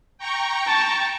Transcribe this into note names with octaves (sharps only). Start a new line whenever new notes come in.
G5 A#5 C#6
A5